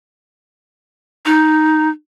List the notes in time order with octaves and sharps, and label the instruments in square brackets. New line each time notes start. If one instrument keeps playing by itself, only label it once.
[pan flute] D#4